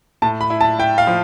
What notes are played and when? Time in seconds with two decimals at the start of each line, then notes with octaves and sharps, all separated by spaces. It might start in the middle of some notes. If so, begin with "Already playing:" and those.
0.22 A2 A5
0.41 B5
0.50 E4
0.61 A5
0.79 E4 G5
0.98 F5
1.07 F3